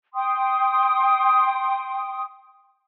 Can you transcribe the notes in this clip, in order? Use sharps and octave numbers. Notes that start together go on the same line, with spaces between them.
G5 C6 D#6